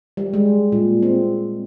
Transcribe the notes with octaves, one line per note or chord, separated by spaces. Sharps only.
G3
G#3
A#2
C4